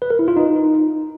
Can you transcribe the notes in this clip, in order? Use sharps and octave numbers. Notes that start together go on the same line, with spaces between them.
B4
A#4
E4
F4
D#4